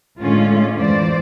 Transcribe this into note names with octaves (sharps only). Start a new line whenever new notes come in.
A2 D3 G#3 C#4 F4
E2 E3 C5 D5